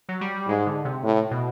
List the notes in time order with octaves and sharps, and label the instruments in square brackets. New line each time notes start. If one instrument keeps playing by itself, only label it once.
[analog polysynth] F#3
G3
[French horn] G#2 [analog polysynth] G#3
[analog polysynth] D3
C3
[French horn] A2
[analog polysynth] B2